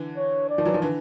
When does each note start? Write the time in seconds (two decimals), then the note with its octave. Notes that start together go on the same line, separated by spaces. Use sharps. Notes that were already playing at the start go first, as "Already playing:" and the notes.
Already playing: D3 E3
0.17 C#5
0.50 D5
0.58 D#3 F3
0.65 E3 F#3
0.74 D#3 F3
0.82 D3 E3